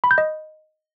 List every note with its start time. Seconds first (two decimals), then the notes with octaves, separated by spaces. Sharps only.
0.04 B5
0.11 G6
0.18 D#5